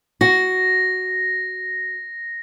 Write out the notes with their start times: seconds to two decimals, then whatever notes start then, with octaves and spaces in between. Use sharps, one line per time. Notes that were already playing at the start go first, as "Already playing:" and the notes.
0.21 F#4 A#6